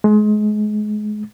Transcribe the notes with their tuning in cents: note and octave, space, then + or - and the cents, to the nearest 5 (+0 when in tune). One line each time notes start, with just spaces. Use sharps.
G#3 +30